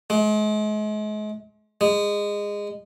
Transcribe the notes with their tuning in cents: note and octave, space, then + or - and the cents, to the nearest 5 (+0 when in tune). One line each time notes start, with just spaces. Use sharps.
G#3 +40
G#3 -20